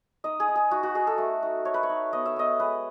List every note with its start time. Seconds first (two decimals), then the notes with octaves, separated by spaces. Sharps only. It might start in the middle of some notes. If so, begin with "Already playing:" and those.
0.24 D#4 D#5
0.40 G#4
0.48 D#4
0.55 G#4
0.71 D#4 F#4
0.83 F#4
0.95 D#4 G#4
1.07 A4
1.18 A3
1.43 D#4
1.65 A3 C#5
1.74 B4
1.83 C#5
1.89 D#4
2.13 B3 D#5
2.26 E5
2.36 B3 D#5
2.60 G#3 B4